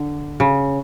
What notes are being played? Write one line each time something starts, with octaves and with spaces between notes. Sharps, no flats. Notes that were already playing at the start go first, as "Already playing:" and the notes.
Already playing: D3
C#3